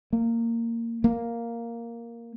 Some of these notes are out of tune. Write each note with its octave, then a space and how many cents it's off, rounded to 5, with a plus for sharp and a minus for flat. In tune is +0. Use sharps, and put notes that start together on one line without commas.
A#3 -15
A#3 +0